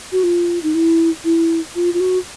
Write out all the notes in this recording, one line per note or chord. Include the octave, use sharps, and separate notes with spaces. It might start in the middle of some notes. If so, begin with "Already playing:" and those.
F#4
F4
D#4
E4
E4
F4
F4
F#4